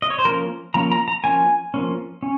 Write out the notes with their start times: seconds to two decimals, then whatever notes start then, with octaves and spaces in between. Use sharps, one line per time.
0.02 D#5
0.10 C#5
0.19 C5
0.25 F3 A#3 C#4 A#4
0.74 F3 A#3 C#4 A#5
0.92 A#5
1.08 A#5
1.24 F3 A#3 C#4 G#5
1.74 F3 A#3 C#4
2.23 C#4